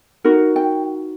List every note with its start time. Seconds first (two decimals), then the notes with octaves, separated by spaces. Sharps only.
0.25 D#4 F#4 A#4
0.56 G5